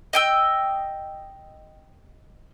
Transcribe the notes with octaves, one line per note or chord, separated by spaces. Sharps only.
D#5 G5 E6